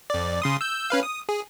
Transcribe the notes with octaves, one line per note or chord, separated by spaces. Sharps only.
F2 D5
C#3 C6 D#6
E6 G6
C#4 B4 F5
D#6
G#4